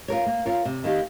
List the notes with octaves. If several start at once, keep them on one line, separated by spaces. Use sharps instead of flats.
F4 A#4 C#5
A#3
F4 A#4 C#5
C3
D#3 A#3 D#4 G4